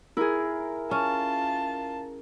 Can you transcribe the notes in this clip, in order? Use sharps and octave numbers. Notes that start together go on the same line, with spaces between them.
E4 G#4 A#4
C#4 F4 A5